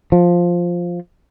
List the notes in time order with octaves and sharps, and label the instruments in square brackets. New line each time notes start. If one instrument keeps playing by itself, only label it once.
[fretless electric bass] F3